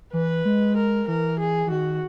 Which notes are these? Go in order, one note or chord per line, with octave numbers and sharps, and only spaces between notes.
E3 B4
G#3
A#4
E3 A#4
G#4
E3
D#3 F#4